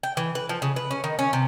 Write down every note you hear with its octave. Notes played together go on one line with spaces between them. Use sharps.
G5
E3
B4
F3
C#3
B4
C#4
D#3
C#4
C3